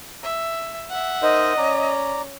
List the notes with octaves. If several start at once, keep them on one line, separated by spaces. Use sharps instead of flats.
E5
E5 F#5
D#4 A#4 C5 D#5
C#4 D5 A#5